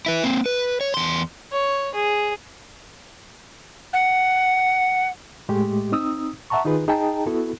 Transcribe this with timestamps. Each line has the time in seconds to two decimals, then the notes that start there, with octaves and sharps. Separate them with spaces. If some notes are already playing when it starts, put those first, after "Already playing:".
0.06 E4 B4
0.24 A#3 C4
0.46 B4
0.81 C#5
0.94 E2 C6
1.52 C#5
1.95 G#4
3.93 F#5
5.49 A2 G#3 A3 G4
5.92 C4 D#4 D#6 E6
6.50 E5 F#5 A5 A#5 C#6
6.65 D#3 D#4 F4 G#4 B4
6.88 D#4 G#4 D#5 G5 A5 A#5
7.27 B3 E4 F#4 A4